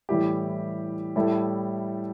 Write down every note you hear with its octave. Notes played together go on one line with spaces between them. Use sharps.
A2 E3 G3 E4 G4
A2 G3 E4 A4